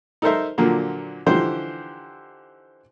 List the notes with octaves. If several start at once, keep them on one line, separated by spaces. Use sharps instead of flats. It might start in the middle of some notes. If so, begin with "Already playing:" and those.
D#4 A4 A#4 C5 E5
A#2 D3 F3 F#3 A#3
D3 E3 F3 D#4 G4 C5